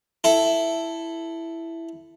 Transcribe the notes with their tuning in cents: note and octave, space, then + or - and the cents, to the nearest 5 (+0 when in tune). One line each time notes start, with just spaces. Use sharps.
E4 +5 A4 +0